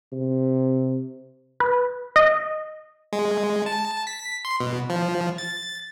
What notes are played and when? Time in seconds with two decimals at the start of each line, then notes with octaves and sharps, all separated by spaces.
0.12 C3
1.60 B4
2.16 D#5
3.13 G#3
3.66 A5
4.07 B6
4.45 C6
4.60 B2
4.90 F3
5.38 A6